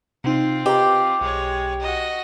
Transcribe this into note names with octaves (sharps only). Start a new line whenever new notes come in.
C3 C4 D#4 F4
G4 B4 D#5 A#5
B1 G#3 C#5
F#4 D#5